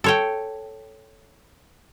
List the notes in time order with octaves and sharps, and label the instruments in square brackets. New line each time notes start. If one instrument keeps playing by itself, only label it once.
[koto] A4 C#5 G5